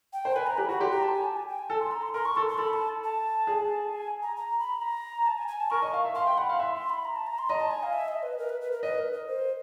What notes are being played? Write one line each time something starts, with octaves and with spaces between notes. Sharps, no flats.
G5
C5
B4 G#5
A#5
G4 B5
F#4 B5
G4 C6
A#5
A5
G#5
A5
G#5
G5
G#5
A4 A5
C6
A#5
C6
A#4 C6
C#6
A4 C6
C6
A4 B5
A5
A5
G#4
G#5
A#5
A#5
B5
A#5
A5
G#5
G#5
A5
A#4 C#6
D#5
F5
E5
F5 C6
G5
F#5 B5
F5
E5 C6
C6
B5
A#5
A5
A#5
C6
D#5 A#5
A5
G#5
F5
E5
D#5
B4
A#4
B4
B4
A#4
B4 D#5
A#4
A#4
C5